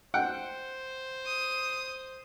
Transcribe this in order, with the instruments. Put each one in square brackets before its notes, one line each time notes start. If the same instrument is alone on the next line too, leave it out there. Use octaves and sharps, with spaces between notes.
[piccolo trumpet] C5 [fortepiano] F#5 G5
[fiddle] D#6